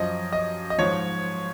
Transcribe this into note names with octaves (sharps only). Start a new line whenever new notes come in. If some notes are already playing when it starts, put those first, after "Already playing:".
Already playing: F#2 F3 D#5
D#5
D#5
G#2 F3 C#5